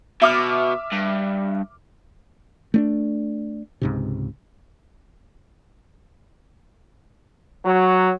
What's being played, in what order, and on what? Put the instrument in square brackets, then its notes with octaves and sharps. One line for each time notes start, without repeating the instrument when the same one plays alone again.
[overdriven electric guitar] B2 [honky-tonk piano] E5 D6 F6
[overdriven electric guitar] G2
[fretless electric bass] A3 C#4 D4
C#2 G#2 C3
[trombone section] F#3